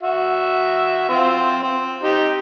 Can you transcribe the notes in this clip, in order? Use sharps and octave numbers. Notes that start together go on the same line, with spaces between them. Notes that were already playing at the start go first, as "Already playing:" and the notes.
F#4 E5
C4 F4
C4
D#4 G4